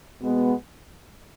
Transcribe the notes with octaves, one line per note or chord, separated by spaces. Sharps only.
B2 G#3 B3